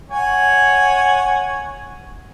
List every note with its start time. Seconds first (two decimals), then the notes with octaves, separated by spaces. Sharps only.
0.11 C#5 F#5 G#5